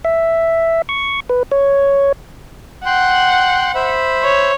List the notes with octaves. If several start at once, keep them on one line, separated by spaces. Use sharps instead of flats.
E5
C#6
B4
C#5
F#5 G5 C6 F#6
C5 E5 B5
C#5